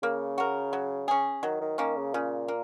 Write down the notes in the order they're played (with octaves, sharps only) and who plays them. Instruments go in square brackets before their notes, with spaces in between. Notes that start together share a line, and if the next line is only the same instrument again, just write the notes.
[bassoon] C#3 [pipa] A#3
[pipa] F#4 A#4
F#3
C#4 G#4
[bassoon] D#3 [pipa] F#3
[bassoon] D#3
[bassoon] D#3 [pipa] A#3 C#4
[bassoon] C#3
[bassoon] A#2 [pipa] C#3
[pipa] A#3